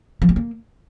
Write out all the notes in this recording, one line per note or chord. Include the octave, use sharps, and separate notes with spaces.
F3
G#3
A#3